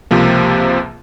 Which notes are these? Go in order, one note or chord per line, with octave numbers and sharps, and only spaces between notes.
C#2 C3 F3 A#3